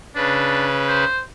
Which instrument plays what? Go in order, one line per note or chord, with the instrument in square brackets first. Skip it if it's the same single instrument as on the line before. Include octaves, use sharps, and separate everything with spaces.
[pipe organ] C#3 B4 [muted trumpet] D4
[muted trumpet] C5